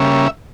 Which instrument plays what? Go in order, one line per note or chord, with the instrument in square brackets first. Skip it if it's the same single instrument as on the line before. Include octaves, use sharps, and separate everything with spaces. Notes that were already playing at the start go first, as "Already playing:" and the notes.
Already playing: [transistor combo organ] C#3 G3 A#3 C#4 E5